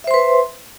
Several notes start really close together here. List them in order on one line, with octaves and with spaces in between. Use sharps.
E5 C5 C6 B4